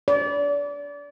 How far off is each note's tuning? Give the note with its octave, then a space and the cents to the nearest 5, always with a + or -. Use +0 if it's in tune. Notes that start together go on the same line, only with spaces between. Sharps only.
D5 -30